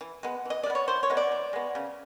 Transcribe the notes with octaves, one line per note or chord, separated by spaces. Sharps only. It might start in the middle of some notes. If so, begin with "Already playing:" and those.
E3
G#3 B3
E3 D#5
G#3 D5
B3
C#5
E3 C5
C#5
G#3 B3
D5
E3
G#3 B3
C#3